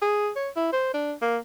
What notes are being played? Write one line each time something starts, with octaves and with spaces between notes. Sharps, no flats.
G#4
C#5
E4
C5
D4
A#3